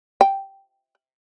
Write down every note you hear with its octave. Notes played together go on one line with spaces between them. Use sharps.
G5